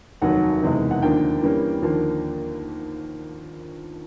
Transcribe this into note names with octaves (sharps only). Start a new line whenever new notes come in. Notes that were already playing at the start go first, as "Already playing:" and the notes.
F1 D#2 D#3 F#3 F#5
F#1 E2 C3 D#3 G#3
F#5
D#2 D3 F3 A#3 D4 G5
G2 E3 G3 A#3 C#4
D#2 D3 F3 A#3 D4